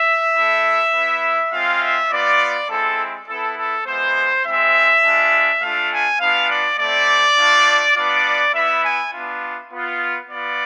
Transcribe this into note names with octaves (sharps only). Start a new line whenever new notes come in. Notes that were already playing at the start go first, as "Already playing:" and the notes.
Already playing: E5
A3 E4
B3 E4
G#3 C4 F4 F5
E5
B3 F4 D5
G#3 C4 E4 A4
B3 E4 A4
A4
G#3 B3 E4 C5
G#3 C4 E4 E5
G#3 D4 F4
A3 D4 F4 F5
G#5
B3 D4 F4 F5
D5
A3 C4 E4 D5
A3 D4 F4
B3 D4 F4 D5
B3 E4 E5
G#5
B3 D4 F4
B3 F4
B3 F4 D5